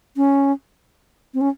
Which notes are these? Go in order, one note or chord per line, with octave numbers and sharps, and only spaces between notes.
C#4
C4
C#4